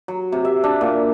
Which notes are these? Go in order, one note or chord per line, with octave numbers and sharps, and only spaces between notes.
F#3
C3
E5
D4
A#2